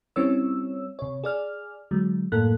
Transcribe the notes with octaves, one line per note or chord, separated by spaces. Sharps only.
G3 C4 C#4 E4 C#5 E6
C3 C#5
G#4 D5 F6
D3 F#3 G#3
F#2 A2 A#3 A4 F#6